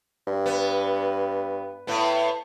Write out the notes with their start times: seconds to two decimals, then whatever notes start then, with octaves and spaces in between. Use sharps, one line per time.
0.27 G2
0.46 B3
1.87 A2 B3